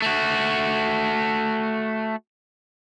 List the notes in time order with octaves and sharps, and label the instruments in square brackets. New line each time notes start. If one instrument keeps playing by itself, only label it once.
[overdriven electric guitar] A3 F#4